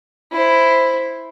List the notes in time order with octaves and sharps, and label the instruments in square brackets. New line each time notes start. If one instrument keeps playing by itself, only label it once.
[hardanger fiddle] E4 C5